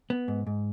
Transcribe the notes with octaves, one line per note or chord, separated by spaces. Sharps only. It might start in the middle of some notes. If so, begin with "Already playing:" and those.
B3
G#2
G#2